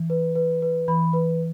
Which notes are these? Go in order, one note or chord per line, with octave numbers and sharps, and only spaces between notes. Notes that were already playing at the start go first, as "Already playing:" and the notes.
Already playing: E3
B4
B4
B4
E3 B5
B4